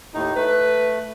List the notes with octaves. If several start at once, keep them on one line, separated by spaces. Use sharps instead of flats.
D#2 A2 D#4
A3 B4